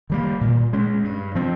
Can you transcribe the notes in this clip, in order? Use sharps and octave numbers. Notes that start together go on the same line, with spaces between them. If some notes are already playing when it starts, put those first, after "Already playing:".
D#3 G3 A#3
A#2
G#3 C#4
G2
F3 C4